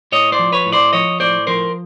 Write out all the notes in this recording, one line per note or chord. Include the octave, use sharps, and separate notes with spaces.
A2 C#5 D#5
C5 D5
F3
B4 C#5
A2
C5 D5
F3 C#5 D#5
A2 C5 D5
F3 A#4 C5